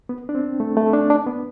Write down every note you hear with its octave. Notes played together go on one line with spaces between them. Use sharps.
B3
D4
C4
A3
A3
D4
D4
B3